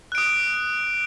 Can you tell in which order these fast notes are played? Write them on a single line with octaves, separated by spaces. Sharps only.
F#6 D7 D#6